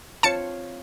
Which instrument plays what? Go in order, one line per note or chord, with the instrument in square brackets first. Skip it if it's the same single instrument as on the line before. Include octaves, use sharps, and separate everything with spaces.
[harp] C4 F4 C#5 [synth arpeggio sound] A5 C#7